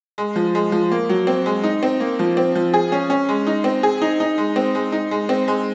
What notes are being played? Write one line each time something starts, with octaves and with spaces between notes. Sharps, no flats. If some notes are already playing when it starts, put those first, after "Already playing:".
G#3
F3
G#3
F3
A#3
F#3
C4
G#3
D#4
C4
A#3
F3
C4
F3
G#4
C#4
C#4
G#3
D#4
C4
G#4
D#4
D#4
G#3
C4
G#3
D#4
G#3
C4
G#3